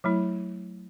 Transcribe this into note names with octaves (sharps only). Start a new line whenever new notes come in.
F#3 A3 E4